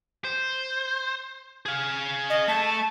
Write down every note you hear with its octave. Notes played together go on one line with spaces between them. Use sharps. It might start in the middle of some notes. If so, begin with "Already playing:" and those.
C5
G#4 F5
D#5
A3 A5